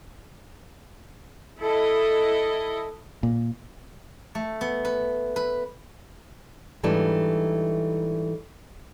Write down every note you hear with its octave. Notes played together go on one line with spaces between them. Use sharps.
E4 A4 D#5
A#2
A3
B3
B4
B4
G#2 E3 G3 A3 D4